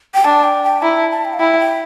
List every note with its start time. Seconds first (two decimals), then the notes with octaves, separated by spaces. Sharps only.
0.14 G5
0.25 D4 A5
0.44 G5
0.64 G5
0.82 E4 A#5
0.97 A5
1.11 A5
1.25 G5
1.34 F5
1.39 E4 G5
1.59 G5